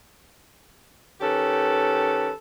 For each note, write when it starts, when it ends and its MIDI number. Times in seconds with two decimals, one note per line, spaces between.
1.21 2.30 51
1.21 2.30 61
1.21 2.30 67
1.21 2.30 69
1.21 2.30 71